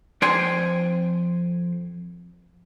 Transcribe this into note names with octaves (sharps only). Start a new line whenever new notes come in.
F2 C5 G5 G#5 C6